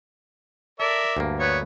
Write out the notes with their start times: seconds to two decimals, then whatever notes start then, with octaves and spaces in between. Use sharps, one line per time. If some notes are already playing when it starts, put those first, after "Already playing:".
0.80 A4 A#4 D5 E5
1.17 D2 G2 A#3
1.39 B3 C#5